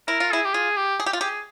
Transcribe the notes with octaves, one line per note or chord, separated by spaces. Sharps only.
E4 A#4
F4
E4 G#4
G4
F4 G#4
G4
G#4
G4
F4
G4 G#4